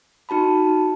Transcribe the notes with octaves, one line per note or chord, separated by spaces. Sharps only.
D#4 F#4 A5 B5